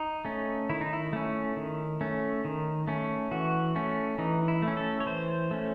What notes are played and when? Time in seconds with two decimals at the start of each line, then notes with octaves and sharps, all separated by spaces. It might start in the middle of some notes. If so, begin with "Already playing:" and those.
Already playing: D#4
0.25 A3 C#4
0.69 D#3 E4
0.81 D#4
0.93 E4
1.13 A3 C#4
1.57 D#3
2.01 A3 C#4
2.45 D#3
2.87 A3 C#4
3.31 E3 F#4
3.76 A3 C#4
4.18 E3 D#4
4.48 E4
4.62 A3
4.67 C#4
4.77 A4
5.00 C#5
5.06 E3 C5
5.51 A3 C#4